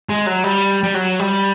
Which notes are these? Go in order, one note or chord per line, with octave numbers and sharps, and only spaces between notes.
G#3
F#3
G3
G3
F#3
G3